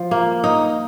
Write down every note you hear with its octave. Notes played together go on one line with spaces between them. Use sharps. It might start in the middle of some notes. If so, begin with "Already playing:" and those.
Already playing: F3
A#3
D#4